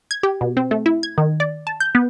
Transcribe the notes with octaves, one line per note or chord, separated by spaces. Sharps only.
G#6
G4
B2
C4
A3
E4
G#6
D#3
D5
A5
G6
B3